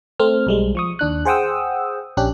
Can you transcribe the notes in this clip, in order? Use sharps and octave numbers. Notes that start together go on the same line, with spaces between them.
A3 C4 F6
B1 G3 G#3
F3 C#6 D#6
D#2 D4 F#6
G#4 C5 F#5 G5 D#6 E6
A#1 C#4 D4 G4 F#6